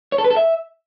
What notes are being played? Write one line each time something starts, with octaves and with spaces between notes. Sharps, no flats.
C#5
A4
B4
A4
E5